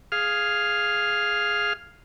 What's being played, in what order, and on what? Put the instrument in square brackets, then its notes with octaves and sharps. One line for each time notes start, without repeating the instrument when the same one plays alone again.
[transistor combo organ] G#4 F5 F6